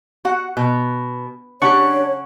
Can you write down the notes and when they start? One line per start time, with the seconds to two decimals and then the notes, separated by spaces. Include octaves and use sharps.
0.25 F#4 F#5
0.57 B2
1.62 C#3 D4 G4 C#5 F#5 C#6